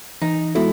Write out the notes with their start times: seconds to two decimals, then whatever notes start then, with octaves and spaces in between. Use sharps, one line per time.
0.22 E3 D#4
0.55 G#3 B3 E4 F#4 A4